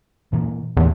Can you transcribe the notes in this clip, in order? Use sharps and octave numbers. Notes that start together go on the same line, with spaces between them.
A#2 E3 A#3
E2 A2 E3